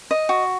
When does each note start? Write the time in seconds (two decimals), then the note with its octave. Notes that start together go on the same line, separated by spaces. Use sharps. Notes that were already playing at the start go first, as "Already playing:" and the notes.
0.11 D#5
0.29 F#4